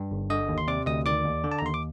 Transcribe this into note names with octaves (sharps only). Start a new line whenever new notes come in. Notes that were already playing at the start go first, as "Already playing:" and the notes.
Already playing: G2
G1
D3 D#5 D#6
D#2
C6
C3 D5 D6
D2 D#5 D#6
D#3 D5 D6
D#2
D3
A5
A#5
D#2 C6
D6